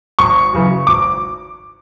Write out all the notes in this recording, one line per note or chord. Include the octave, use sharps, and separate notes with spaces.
G#1 C#6
F#2 C#3 E3
G#1 D6